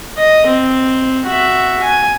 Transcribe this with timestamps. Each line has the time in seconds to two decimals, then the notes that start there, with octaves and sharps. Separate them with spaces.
0.17 D#5
0.47 C4
1.26 F#4 E5
1.83 G#5